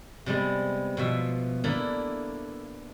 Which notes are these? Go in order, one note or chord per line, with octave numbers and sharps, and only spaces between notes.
C3 G3 G#3 B3
B2 F3 E5
A#3 B3 D4 E4 A4